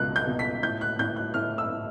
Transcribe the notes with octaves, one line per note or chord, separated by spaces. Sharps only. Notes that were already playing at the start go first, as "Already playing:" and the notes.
Already playing: C#2 B2 F#6
G6
B2
B6
A2 G6
F#6
A2 G6
F#6
A2 F6
E6
A2